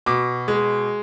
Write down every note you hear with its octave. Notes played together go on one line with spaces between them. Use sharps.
B2 D6
G#3